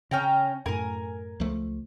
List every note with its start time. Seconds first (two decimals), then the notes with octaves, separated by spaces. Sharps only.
0.11 C#3 C#4 G5 A#5
0.66 F#2 A2 A#4 G#5
1.40 C#2 F3 A3